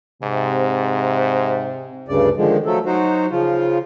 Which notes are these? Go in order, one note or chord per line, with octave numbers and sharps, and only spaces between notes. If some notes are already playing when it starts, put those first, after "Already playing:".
G#2 C3
D2 G2 C#3 D5
D3 D#3 F3 G#3
F3 F#3 A3 A4
F#3 D#4 F#4 C5
C#3 F3 F4